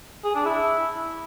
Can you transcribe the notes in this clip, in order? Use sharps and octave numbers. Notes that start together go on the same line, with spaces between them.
G#4
D4
E4